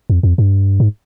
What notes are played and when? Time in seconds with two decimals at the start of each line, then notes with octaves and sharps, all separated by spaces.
0.10 F2
0.23 F2
0.38 G2
0.80 G#2